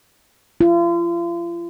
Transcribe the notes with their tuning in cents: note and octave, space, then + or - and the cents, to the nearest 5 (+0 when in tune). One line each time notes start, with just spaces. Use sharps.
F4 -40